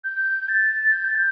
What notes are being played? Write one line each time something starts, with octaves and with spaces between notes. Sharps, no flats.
G6
A6
G6
A6
G6